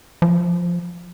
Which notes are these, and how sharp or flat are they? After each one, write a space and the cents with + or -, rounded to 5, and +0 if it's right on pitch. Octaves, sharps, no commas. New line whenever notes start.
F3 +0